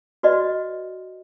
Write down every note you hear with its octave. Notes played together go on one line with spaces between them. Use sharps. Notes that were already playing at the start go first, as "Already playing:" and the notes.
F#4 B4 D5 D#5